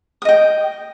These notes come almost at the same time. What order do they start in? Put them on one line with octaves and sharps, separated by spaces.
D#6 D#5 G5